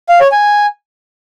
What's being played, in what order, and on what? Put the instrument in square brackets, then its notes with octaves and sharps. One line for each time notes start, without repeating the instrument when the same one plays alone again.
[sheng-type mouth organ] F5
C#5
G#5